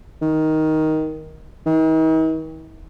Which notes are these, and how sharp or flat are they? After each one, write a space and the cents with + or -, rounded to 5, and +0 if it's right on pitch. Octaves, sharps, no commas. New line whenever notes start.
D#3 +10
D#3 +45